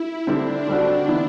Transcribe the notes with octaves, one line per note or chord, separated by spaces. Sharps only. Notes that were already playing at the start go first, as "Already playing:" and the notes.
Already playing: E4
D3 G3 C4 D4
D3 G3 C4 F#4
E3 B3 E4